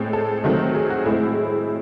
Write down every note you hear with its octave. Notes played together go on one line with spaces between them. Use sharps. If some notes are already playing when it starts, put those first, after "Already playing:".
Already playing: A2 G#3 C4
A4
C3 D#3 F#3 A3 C4
G#4
F#4
A2 G#3 C4 E4